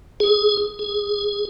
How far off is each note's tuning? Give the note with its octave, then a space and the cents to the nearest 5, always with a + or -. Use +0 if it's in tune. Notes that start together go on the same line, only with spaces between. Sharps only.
G#4 +20
G#4 +10